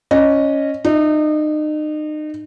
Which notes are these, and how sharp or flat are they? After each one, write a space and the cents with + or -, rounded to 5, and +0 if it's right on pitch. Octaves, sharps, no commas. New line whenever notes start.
C#4 +0 D#5 -15
D#4 -35 E5 -40